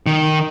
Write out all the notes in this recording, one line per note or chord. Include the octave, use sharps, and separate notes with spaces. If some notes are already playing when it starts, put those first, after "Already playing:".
D#3